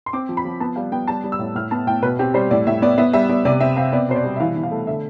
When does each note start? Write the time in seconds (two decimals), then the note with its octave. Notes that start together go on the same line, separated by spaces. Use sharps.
0.06 C6
0.13 C4 D6
0.29 F3
0.37 B5
0.45 F3
0.60 B3 A5
0.76 G3 F5
0.92 B3 G5
1.08 G3 A5
1.24 G3
1.32 E6
1.39 A2
1.55 A2 F6
1.71 B3 A5
1.87 A2 G5
2.02 B2 B4
2.19 C4 G4
2.34 G3 C5
2.51 A2 D5
2.67 A2 E5
2.82 B3 D5
2.98 B3 E5
3.13 G3 E5
3.29 B3 D5
3.45 C3 D5
3.61 C4 E5
3.77 C4 F5
3.92 B3 D5
4.09 B2 C5
4.16 D5
4.24 G3
4.36 E5
4.40 E3 F5
4.56 E3
4.63 F5
4.71 A3
4.87 D3 E5